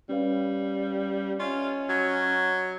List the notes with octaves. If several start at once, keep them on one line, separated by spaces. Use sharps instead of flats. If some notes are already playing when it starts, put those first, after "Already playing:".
G3 C#4 B4 F5
C#4 F4 D#5 E5
F#3